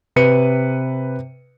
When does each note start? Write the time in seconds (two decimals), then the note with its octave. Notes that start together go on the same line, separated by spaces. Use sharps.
0.16 C3 B4 C#7 D#7